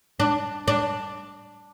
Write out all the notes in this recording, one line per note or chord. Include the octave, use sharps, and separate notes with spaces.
D4
D4